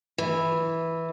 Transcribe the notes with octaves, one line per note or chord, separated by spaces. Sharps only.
E3